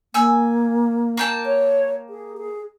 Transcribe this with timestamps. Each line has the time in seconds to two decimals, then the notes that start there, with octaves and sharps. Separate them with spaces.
0.14 A#3 G#5 E6
1.17 A#3 G5 A5
1.46 C#5
2.09 G#4
2.38 G#4